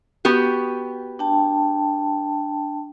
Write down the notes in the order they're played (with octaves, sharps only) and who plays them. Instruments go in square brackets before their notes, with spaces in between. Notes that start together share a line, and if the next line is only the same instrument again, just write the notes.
[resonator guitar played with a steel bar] B3 F#4 G4
[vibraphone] D4 G5 A5